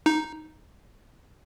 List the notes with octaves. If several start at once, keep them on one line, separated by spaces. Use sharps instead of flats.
D#4